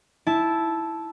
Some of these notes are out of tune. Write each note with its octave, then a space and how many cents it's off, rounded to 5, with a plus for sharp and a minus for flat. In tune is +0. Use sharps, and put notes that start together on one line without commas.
E4 +0 A5 -10